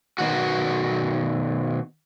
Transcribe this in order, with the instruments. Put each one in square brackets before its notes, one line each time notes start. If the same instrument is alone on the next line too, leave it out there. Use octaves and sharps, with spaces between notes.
[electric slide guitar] B2 D#3 F#4